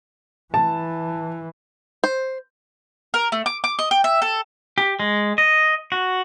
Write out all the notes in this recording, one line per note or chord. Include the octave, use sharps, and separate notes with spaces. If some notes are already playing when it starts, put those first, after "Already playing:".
E3 A5
C5
A#4
A3
D6
D6
D#5
G5
E5
A4
G4
G#3
D#5
F#4